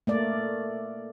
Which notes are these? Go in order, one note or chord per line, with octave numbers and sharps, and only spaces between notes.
A3 A#3 D5